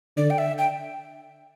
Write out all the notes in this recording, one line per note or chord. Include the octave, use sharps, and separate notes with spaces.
D3 D5
G5
E5
G5